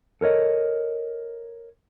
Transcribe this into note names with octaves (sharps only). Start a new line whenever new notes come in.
A4 A#4 C#5 D#5